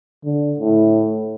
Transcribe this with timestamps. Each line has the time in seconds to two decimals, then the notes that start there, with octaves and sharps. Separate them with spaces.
0.25 D3
0.59 A2